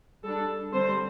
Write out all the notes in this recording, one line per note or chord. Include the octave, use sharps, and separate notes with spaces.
G3 D4 A4
D3 G3 C4 C5